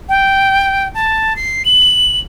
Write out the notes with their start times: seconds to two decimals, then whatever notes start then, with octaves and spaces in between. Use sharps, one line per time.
0.09 G5
0.95 A5
1.36 C7
1.65 F#7